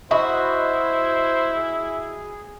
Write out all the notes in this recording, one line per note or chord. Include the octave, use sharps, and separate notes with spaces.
E4 F#4 C5 D#5 B5
G#4